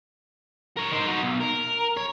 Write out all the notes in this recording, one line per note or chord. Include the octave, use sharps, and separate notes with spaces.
A#4 C#5
D#4 C5
D#4 F#4
B1
A#4
C#5